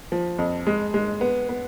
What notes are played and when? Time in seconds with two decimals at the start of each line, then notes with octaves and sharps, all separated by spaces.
0.12 F3
0.39 F2
0.67 G#3
0.94 G#3
1.21 B3
1.49 B3